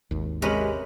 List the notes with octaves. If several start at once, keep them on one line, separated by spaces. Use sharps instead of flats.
G#1 D#2
C3 G#3 C#4 A#4 B4 B6 F#7